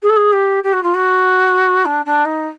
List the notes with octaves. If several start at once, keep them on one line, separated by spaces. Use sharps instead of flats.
G#4
A4
G#4
G4
G4
F#4
F4
F#4
D4
D4
D#4